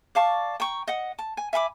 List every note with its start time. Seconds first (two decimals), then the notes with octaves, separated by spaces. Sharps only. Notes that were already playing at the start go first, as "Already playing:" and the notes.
0.15 D5 F5 A5 C#6
0.60 G5 A#5 C#6
0.88 D#5 F#5
1.19 A5
1.37 G#5
1.53 E5 G#5 B5 D6